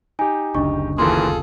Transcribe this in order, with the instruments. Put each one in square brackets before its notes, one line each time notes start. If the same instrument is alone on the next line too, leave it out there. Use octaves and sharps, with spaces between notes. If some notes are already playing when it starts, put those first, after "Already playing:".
[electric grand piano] D#4 G4 [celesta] G#5
[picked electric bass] F#1 D2 C#3 [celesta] D4 D#5 C#6
[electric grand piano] D#2 E3 A#3 [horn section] F4 G#4 A4 [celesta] C6